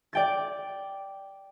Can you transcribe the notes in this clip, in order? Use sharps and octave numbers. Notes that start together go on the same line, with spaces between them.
D5 G5 A6